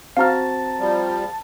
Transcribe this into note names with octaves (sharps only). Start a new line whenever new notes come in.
C4 F#4 F5 A5 A#5 F6
F3 G3